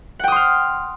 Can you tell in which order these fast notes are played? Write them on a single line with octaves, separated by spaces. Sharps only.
F#5 G5 D#6 C6 F6